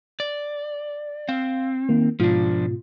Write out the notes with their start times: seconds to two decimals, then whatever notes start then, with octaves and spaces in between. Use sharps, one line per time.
0.20 D5
1.29 C4 F5
1.89 D#3 A#3
2.20 G#2 B2 F3 D4 F4